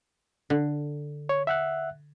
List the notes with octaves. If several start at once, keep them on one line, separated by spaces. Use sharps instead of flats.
D3
C#5
E5 F#5 F#6